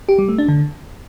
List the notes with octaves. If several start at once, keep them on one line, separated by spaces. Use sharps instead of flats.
G4
G3
A3
D4
D3